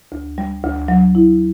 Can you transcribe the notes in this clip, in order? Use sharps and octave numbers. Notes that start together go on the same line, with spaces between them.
D2
G3
D2
F#3
E4